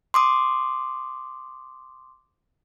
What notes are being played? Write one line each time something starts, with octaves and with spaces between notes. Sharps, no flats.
C6 D6 D#6